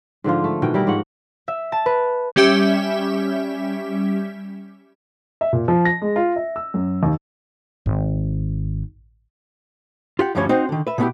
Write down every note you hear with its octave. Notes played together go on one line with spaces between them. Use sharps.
G#2 D3 F3 F4
A3
B2 D#3 E3 G5
G3 E4 A#4
G#2 F3 F#4 F#5
E5
A5
B4
G3 C#4 G4 E5
E5
A#2
F3
A#6
G#3
F4
E5
E6
F#2
D#2
G#1
F4 G4 F#5
D2 G2 F3 G3 C#4 C#5
C4 D#4 F#4 C5
D3 D#3
B4 E5
B2 G3 B3 D4 E4 G4